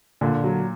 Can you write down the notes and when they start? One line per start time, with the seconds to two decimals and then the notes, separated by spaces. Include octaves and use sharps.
0.21 A#2 D3
0.44 F#3